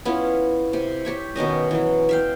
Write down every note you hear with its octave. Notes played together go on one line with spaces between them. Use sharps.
B3 C#4 E4 F4
C3
G4 C#5 E5
B2 D#3 C#4 D#5
E3 F#3
E5 F5 G5